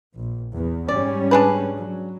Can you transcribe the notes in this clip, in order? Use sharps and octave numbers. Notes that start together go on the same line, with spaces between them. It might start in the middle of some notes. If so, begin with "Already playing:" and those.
A#1
E2
G#2 G3 C#4 D5
D4 G#4 B4
F#3